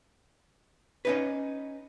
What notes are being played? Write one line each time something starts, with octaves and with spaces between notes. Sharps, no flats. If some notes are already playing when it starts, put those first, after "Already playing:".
C#4 D#4 B4